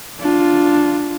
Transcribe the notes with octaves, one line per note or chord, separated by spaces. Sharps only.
D4 F4